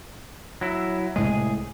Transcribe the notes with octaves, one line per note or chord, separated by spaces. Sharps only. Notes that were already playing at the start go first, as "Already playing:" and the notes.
F#3 E4
C2 A2 G#3 G#4